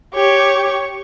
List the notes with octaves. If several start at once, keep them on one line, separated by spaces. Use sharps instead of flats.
G4 C#5